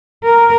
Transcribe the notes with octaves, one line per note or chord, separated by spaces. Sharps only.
A#4